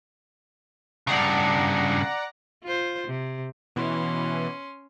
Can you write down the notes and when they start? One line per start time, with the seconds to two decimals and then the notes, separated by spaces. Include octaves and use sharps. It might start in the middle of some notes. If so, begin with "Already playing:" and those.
1.07 G2 C#3 D5 F#5 A#5
2.64 F4 C5
3.08 C3
3.76 B2 E3 C#4 C6